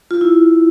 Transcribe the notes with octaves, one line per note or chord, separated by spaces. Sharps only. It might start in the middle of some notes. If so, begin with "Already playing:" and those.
F4
E4